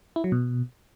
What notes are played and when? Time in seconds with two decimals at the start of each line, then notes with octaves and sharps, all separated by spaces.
0.16 E4
0.24 F#3
0.32 B2